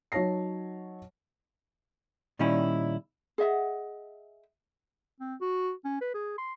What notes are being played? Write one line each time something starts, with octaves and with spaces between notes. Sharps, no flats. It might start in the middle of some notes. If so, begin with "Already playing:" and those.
F#3 D#4 C#5 A5 A#6 C7
A#2 D#3 G3 C#4 D#4 E4
G#4 D#5 E5 F#5
C4
F#4
C#4
B4
G#4
C6